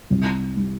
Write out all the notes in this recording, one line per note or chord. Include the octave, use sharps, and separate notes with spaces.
C2
G3